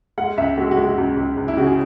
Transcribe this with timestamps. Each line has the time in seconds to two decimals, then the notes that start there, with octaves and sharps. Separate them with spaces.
0.18 G#3 F#5
0.38 C#2 E5
0.57 G#3 F#4
0.71 F#4
0.77 G#3
0.84 F#4
0.98 C#2
1.17 C#2
1.37 C#2
1.48 E4
1.57 C#3 F#4
1.67 G#4